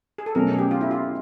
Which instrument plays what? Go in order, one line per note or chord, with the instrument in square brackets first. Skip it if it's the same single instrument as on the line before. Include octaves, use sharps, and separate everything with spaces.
[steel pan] G#4
A4
[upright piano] B2 F#3 A3 C#4 [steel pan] A#4
[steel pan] G#4
G4
F4
E4
F4